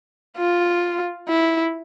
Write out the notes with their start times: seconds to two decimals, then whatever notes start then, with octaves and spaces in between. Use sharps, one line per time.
0.38 F4
1.29 E4